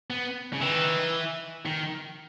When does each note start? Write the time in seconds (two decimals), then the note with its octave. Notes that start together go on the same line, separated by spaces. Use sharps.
0.10 B3
0.53 C#3
0.61 D#3 E3
1.66 D#3